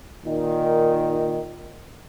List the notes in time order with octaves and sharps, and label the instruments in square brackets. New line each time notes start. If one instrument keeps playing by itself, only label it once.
[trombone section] A#2 D#3